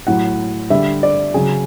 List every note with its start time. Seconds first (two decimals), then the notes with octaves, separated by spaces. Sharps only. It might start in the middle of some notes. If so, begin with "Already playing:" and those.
0.07 A2 F#3 F#5
0.70 D3 G3 E5
1.03 D5
1.34 C#3 F#3 G#4